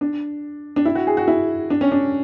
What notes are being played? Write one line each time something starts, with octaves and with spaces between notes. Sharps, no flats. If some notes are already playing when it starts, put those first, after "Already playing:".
D4
D4
E4
F#4
G#4
F#4
E4
D4
C#4
D4